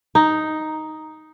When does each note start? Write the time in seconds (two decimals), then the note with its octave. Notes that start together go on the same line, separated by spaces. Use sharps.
0.15 D#4